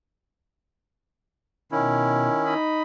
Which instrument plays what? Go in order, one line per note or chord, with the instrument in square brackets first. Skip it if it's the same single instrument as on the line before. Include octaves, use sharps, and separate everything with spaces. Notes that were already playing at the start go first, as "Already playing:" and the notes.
[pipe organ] B2 [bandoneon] D#3 C#4 E4
[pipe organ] D#4 D#5 B5